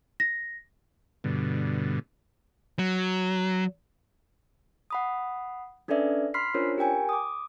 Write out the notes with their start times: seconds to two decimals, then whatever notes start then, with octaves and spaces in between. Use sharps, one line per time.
0.20 A#6
1.24 G2 B2 D3
2.79 F#3
4.90 F#5 B5 D#6
5.88 C#4 D4 A4 B4 D5 E5
6.34 B5 C6 F6 B6 C7
6.54 C#4 D4 F4 A#4 C5 C#5
6.78 G4 A#4 G5 G#5
7.09 D6 D#6